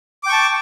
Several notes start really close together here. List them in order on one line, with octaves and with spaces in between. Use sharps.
D6 G5 C#6 A5